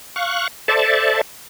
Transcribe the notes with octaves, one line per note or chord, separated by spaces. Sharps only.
F5 C#6 F#6
A4 C5 D5 E5 A5